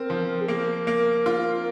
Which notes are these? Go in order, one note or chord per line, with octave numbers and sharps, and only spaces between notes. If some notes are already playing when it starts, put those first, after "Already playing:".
Already playing: C4 A#4
F3
G#4
A#3 A#4
A#3
F4